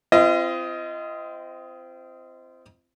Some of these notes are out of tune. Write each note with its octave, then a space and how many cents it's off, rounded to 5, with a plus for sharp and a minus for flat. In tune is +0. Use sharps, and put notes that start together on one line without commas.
C4 -15 F4 -40 D#5 +15